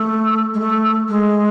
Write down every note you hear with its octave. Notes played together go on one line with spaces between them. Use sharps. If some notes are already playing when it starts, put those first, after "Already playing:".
Already playing: A3
G#3
A3
G#3